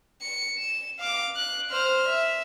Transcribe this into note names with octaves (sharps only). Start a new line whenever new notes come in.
C#7
E7
F5 D6
F#6
C5 F6
E5